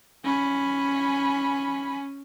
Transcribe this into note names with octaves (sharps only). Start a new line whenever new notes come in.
C#4 G#5 B5